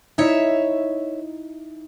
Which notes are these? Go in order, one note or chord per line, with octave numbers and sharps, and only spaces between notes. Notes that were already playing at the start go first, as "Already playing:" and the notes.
D#4 E4 C#5 E5